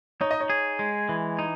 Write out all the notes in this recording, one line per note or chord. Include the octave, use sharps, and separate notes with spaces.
D#4 C#5
D#5
C#5
G#4
G#3
E3
D#4